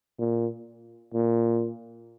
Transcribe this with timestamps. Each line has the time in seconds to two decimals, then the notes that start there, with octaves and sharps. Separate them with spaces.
0.19 A#2
1.14 A#2